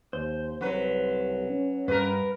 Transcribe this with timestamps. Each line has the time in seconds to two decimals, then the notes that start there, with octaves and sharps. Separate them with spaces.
0.13 D#2 C5
0.61 C2 F#3 B4
1.49 C#4
1.88 G2 A#4 B4